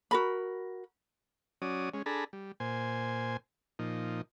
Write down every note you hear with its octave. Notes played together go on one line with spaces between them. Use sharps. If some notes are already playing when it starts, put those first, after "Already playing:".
F#4 A#4 B5
F#3 C#4 D5 D#6
G#3 C#4
D4 G#4 A4 A#5 B5
G3
A#2 C5 G#5
A#2 F3 D#4